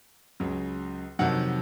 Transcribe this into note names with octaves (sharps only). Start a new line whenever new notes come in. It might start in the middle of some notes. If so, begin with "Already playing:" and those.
C#2 C#3 F#3
F2 C3 D#3 F#3 F#5